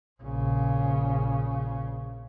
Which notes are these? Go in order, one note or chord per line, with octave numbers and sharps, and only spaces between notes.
A#1 C#3